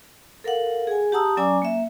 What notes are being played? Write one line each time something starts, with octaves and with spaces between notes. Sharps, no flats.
A4 A#4 F5 F#5
G#4 G#5
G4 F#5 A5 A#5 D#6 E6
F#3 C#4 D5 G#5 A#5 D6
A#3 E5